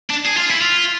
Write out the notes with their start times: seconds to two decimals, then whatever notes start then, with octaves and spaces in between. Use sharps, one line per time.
0.10 D4
0.25 G#4
0.37 F4
0.50 E4
0.61 F4